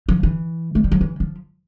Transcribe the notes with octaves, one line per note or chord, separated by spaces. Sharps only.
F3
E3
A3
G3
F3
E3
F3